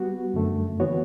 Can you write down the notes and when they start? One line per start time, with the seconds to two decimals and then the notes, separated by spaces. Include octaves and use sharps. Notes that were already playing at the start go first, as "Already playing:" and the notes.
Already playing: G3 B3 F#4
0.34 F#2 D3 A3
0.80 E3 B3 F#4 C#5